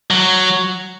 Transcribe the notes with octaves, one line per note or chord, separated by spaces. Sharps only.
F#3